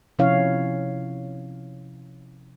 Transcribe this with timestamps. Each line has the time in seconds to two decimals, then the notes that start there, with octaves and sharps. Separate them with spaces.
0.19 C3 F3 C#4 E4 C#5 F5